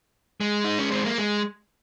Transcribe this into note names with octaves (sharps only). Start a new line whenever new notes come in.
G#3
D#4
C#4
C4
A#3
G#3